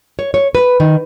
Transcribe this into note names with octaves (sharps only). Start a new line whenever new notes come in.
C#5
C#5
B4
D#3